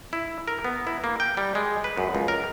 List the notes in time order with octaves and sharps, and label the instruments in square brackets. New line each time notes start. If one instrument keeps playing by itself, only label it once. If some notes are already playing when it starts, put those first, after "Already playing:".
[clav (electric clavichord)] E4
A#4
B3
E4
A#3
G5
G3
G#3
B4
F#2
C#2
A#4